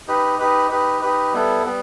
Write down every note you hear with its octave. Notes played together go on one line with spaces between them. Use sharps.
D#4 G4 B4
D#4 G4 B4
D#4 G4 B4
D#4 G4 B4
G3 B3 E4 A4
G3 B3